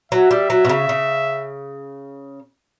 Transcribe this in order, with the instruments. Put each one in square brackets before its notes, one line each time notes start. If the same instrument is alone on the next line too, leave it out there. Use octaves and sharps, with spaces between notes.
[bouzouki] F#3 [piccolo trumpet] E5
[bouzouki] G3
F#3
B2
C#3
C#3